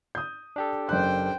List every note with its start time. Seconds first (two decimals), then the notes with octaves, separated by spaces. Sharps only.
0.15 D#6 G6
0.56 D4 G4 A4
0.89 F#1 C5 G5 F#6